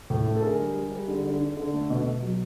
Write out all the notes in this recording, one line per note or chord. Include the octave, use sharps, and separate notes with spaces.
A2
A3
A4
D3 G#4 A#4
G3
G3
G3
D3
D3
D3
D3
A3
B2
B2
F#3